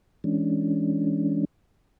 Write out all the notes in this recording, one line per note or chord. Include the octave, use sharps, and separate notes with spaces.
E3 G#3 C#4 D4